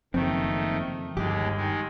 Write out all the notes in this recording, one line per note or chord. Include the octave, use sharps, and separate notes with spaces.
F#1 F2 D#3 A3 C4
G1 D#2 G#3 G4
D#3 G#3